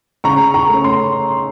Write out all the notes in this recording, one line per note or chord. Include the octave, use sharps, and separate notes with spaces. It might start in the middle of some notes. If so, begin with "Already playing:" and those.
C#3 A#5 C#6
A#5 C#6
A3 C#4
C6